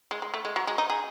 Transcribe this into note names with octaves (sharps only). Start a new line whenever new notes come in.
G#3
G#3
A3
G#3
F#3
G#3
D#4
G#4